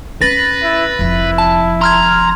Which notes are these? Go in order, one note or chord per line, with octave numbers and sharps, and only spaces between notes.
C#4 B4 A6 A#6
E4
F1 F3 E4
A5
A#5 C6 F6 G#6